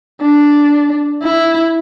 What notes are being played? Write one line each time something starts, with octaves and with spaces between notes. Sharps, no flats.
D4
E4